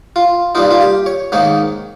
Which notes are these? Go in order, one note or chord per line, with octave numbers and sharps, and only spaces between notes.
F4
G2 G3 A#3 D#4 F4
F4
G4
C#5
G#2 D#3 A#3 D#4 C#5